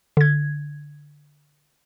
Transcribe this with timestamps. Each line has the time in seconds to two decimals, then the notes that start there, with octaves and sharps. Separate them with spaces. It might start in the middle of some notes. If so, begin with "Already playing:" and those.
0.17 D3 G#6